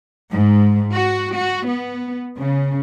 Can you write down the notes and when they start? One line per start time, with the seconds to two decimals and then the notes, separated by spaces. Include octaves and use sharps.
0.30 G#2
0.93 F#4
1.35 F#4
1.67 B3
2.38 C#3